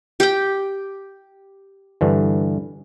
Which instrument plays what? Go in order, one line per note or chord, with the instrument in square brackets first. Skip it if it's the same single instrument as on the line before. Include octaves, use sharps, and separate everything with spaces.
[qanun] G4 G5
[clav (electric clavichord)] G2 D3 E3